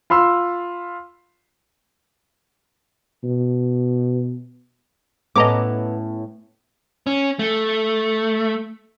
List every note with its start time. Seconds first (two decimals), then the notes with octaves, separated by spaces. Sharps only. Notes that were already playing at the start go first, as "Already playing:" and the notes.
0.10 F4 B5 C6 E6
3.24 B2
5.36 A2 B3 C#4 A4 D#5 A#5 D6
7.07 C#4
7.39 A3